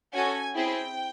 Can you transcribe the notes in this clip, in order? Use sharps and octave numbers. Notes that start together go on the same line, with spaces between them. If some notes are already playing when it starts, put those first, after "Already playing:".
C#4 F#4 A4 G#5
C4 E4 G#4 G5